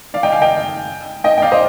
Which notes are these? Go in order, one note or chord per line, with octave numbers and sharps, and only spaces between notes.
D5 F5
D#5 G5
F5 G#5
D#5 G5
D#5 G5
G5
D5 F5
C5 D#5